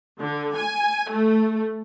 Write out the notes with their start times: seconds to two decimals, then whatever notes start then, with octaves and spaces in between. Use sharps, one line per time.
0.20 D3
0.56 G#5
1.11 A3